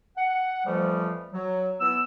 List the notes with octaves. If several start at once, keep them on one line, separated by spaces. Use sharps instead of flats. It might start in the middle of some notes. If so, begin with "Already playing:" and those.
F#5
F2 E3 F3 G3 A3
F#3
E3 B3 E6